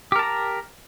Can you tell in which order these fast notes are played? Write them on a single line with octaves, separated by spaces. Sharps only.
G4 A#4 A5 A#5